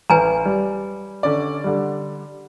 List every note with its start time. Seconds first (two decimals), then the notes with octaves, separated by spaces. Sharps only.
0.10 A1 B4 G#5 A#5
0.46 G3
1.23 D3 C#4 D5
1.64 D3 G3